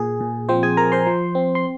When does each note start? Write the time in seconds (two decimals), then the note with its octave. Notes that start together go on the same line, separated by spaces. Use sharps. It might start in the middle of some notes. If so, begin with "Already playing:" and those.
Already playing: A#2 G#4
0.21 A#2
0.49 F3 C4 C5
0.63 G#4 G#5
0.77 F3 A#4 A#5
0.92 C5 C6
1.07 F3
1.35 C4
1.55 C6